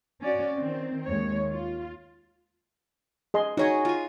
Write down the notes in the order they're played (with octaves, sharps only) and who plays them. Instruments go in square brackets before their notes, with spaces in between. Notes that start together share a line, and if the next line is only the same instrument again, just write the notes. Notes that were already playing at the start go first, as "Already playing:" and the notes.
[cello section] C#4 F#4 D5
D#3 C4
D#2 G#3 C#5
F4
[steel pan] G#4 D#5 C6
[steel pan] D#4 C#5 [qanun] F#4 G#4 D#5
[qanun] F4 G#5